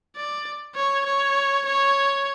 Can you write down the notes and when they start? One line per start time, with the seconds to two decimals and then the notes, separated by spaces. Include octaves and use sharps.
0.16 D5
0.75 C#5
1.06 C#5
1.66 C#5